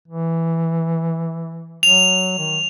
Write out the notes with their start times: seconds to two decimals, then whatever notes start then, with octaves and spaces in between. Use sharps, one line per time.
0.08 E3
1.83 F#3 F7
2.38 D#3